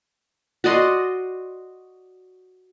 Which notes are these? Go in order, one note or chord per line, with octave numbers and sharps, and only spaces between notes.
F#4 D5 D#5 C6